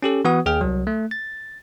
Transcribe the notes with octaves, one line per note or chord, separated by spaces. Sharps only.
C#4 G4 A4
E3 B3 F#4 B4 F#5 D#6
D#2 G#4 G5 F6
C2 F#3
A3
A6